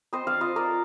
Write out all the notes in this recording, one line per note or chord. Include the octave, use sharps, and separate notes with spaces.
C4 C5 D#5
D5 F5
F4 C5 D#5
A#4 D5